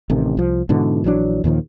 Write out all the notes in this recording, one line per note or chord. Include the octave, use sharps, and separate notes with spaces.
A1 C3 D#3
C2 F3
G#2 B2 D3 E3
A#1 E3 F#3 D4
D#2 A#2 D#3 F3